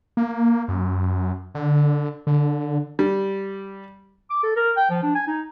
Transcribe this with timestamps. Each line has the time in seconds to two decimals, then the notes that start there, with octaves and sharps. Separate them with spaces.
0.17 A#3
0.68 F#2
1.55 D3
2.27 D3
2.99 G3
4.30 D6
4.43 A4
4.56 A#4
4.77 G5
4.90 F3
5.03 D4
5.15 G#5
5.27 D#4